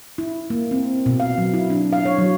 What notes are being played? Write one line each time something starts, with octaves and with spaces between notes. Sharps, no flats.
E4
A#3
C4
B2
F5
F#3
E4
D4
F5
C#5
F#3